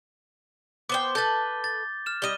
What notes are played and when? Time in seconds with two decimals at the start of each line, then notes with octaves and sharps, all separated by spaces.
0.89 B3 C5 G5 D6 G7
1.15 A4 B4 G6 A6
1.64 A6
2.06 F6 E7
2.22 G3 D#5 D#7 G7